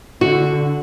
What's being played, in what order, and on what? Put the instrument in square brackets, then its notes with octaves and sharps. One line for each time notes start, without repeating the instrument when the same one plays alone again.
[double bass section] D3 [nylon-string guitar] F#4